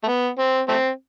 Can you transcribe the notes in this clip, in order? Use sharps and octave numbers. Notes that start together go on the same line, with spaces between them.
A3
B3
C4
A3 C4